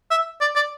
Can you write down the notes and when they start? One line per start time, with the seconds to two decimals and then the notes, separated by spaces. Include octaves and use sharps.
0.11 E5
0.41 D5
0.56 D5